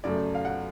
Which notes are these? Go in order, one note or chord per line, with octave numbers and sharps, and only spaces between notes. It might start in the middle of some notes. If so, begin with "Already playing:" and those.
F#2 C#3 F#3 A3 D5
F5
F#5